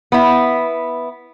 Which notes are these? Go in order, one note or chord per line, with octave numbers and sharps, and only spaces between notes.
B3 E4